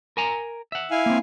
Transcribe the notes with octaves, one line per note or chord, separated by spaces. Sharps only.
A#4 G#5 A#5
E5 F#5
E4 F5 G#5
A#3 C4